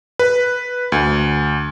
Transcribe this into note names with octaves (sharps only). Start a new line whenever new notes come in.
B4
D2